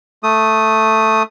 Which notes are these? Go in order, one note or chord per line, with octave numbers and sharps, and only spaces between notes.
A3 D#6